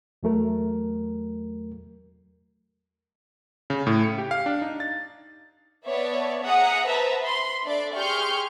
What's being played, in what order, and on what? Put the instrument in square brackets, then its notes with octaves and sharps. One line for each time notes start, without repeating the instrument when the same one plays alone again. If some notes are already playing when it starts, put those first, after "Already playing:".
[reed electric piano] E2 F#3 A3 A#4
[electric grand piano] C#3
A2
C#7
G4
F5
D4
D#4
A6
[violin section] B3 C#5 D5 E5 A5
G#4 E5 F#5 A#5 D#6
B4 C5 E5 A5 A#5
B5 C6
D4 A4 D5 E5
G4 G#4 C6 C#6 F6 G6